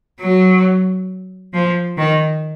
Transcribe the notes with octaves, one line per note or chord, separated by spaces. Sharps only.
F#3
F3
D#3